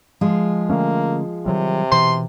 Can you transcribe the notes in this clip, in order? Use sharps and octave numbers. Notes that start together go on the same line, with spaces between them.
F3 G#3 F4
D3 A3 A#3 C#4
C3 D#3 F#3 G3
B2 E3 C6